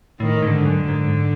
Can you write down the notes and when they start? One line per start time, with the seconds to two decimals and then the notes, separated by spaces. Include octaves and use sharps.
0.20 A2 D#3
0.42 G#2
0.54 D3
0.65 F#2
0.88 G#2